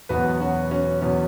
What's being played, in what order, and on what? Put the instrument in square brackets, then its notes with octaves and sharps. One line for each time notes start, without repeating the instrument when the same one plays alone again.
[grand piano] E2 B2 F#3 B3 F#4 B4
C#4 F#4
C#4 F#4
E2 B2 F#3 B3 C#4